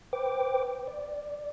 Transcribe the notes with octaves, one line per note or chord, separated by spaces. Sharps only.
B4 C5 G5 D6
D5